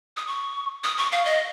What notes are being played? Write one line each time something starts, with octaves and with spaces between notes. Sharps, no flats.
D#6
C#6
D#6
C#6
F5
D#5